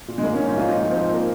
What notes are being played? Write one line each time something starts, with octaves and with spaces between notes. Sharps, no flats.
A#2
G#3
G#2 A#3
F3 C#4
D#4
G#2 F4
A#2 D#4
F3
C4
A#2
A#3